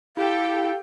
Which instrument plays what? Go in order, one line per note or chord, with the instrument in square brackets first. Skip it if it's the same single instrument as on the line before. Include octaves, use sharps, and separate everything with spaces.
[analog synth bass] E4 [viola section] G4 A4 G5 [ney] F5